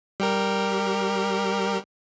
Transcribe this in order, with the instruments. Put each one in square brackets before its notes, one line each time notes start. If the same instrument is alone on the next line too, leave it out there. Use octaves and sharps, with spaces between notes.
[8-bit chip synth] G3 G4 A#4